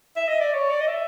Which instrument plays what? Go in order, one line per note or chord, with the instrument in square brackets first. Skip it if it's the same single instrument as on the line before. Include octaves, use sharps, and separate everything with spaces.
[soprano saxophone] E5
D#5
D5
C#5
D5
D#5
E5